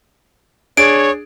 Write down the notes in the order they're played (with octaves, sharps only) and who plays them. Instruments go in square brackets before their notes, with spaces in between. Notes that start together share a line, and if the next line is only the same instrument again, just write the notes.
[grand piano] D4 G#4 [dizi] C#5 [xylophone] D7